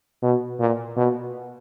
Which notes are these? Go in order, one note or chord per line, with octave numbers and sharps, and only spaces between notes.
B2
A#2
B2